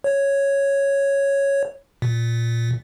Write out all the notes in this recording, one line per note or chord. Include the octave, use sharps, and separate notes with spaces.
C#5
A#2